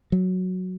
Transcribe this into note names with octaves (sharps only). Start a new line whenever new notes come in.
F#3